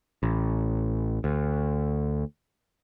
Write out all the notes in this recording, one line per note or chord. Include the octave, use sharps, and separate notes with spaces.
A1
D2